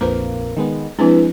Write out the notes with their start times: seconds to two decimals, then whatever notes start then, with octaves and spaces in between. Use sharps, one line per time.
0.01 A#1 F2 A#3 B4 C5
0.57 D#3 G#3 B3
0.99 F3 G#3 C4 D4 E4 B4